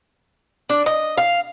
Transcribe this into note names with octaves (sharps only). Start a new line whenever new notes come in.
D4
D#5
F5